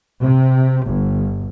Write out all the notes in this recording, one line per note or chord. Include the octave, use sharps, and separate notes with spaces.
C3
G1